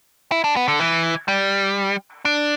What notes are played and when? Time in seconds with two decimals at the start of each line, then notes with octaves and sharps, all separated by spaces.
0.32 E4
0.44 D4
0.56 B3
0.68 D3
0.80 E3
1.28 G3
2.25 D4